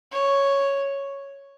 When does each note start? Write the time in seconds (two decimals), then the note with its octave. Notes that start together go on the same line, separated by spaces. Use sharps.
0.12 C#5